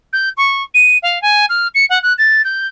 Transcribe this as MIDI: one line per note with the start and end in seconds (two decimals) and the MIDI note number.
0.13 0.29 91
0.37 0.63 85
0.74 0.98 99
1.03 1.21 77
1.22 1.46 80
1.49 1.68 89
1.75 1.85 97
1.90 1.99 78
2.03 2.13 90
2.18 2.42 93
2.45 2.67 91